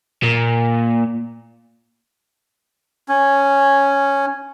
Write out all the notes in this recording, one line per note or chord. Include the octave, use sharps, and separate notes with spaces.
A#2
C#4